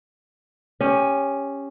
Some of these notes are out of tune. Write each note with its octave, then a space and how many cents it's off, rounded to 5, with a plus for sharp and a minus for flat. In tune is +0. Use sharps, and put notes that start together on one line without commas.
C#4 +0 G4 +20